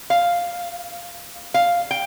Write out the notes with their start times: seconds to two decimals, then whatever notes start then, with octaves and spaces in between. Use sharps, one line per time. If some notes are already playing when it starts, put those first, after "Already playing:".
0.10 F5
1.54 F5
1.91 G5